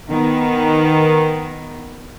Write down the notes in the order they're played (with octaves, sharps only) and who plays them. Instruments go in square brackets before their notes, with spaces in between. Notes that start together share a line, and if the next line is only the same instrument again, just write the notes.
[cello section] D#3 B3